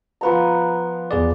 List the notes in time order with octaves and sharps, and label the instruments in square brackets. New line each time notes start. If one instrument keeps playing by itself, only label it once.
[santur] F3 B3 A#5
[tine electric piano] E2 G#4 D5